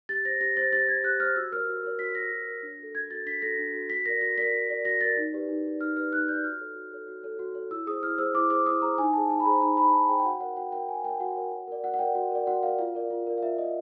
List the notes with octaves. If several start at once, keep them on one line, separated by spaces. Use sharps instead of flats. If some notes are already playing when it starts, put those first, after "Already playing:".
G4 A6
C5 A#6
G4 A#6
C5 A6
G4 A6
C5 G#6
G4 F#6
C5 F6
F#4 E6
A#4 C#5 F6
F#4
A#4 C#5
F#4 B6
A#4 C#5 A#6
F#4
A#4 C#5
D4
F#4 A4
D4 G#6
F#4 A4 A6
D4 B6
F#4 A4 A#6
D4
F#4 A4
F#4 B6
A#4 D5 A#6
F#4 A#6
A#4 D5 B6
F#4
A#4 D5
F#4 A#6
A#4 D5 A6
D#4
G4 B4 D5
D#4
G4 B4 D5
D#4 F6
G4 B4 D5 F6
D#4 F#6
G4 B4 D5 G6
F#4 F6
A4 C#5
F#4
A4 C#5
F#4
A4 C#5
F#4
A4 C#5
E4 E6
G#4 C5 D#6
E4 F6
G#4 C5 E6
E4 D6
G#4 C5 D6
E4 D#6
G#4 C5 A#5
D#4 G#5
G#4 C5 A5
D#4 A5
B5
G#4 C5 A#5
D#4 A#5
G#4 C5 B5
D#4 A5
G#4 C5 G5
G5
F#4 F#5
A#4 C#5 F#5
F#4 G5
A#4 C#5 G5
F#4 G#5
A#4 C#5 G5
F#4 F#5
A#4 C#5
F#4
A#4 D5
F#4 F#5
F#5
A#4 D5 G5
F#4
A#4 D5
F#4 F#5
A#4 D5 F5
F4 F5
A#4 D5
F4
A#4 D5
F5
F4 E5
A#4 D5 D#5